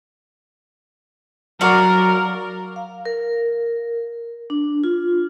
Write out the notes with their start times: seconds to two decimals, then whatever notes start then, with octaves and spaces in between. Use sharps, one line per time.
1.61 F#3 F#4 A#4 D5 F5
2.76 F5
3.06 A#4
4.50 D4
4.84 F4